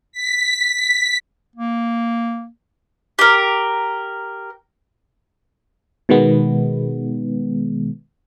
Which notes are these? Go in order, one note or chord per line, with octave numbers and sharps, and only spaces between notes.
B6
A#3
G4 A#4
B2 D#3 G#3 B3